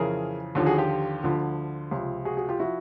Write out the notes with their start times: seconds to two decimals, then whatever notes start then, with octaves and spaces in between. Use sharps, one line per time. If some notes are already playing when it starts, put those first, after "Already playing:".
Already playing: F2 C#3 E3 G#4 A#4
0.55 D#2 D3 F3
0.66 F#4 G#4
0.78 F4 G4
1.23 D2 D3 F3
1.91 C#2 C3 F3
2.25 F#4 G#4
2.37 F#4 G#4
2.49 F4 G4
2.60 F3 E4 F#4